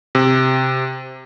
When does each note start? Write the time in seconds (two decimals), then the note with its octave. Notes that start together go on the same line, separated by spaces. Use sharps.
0.15 C3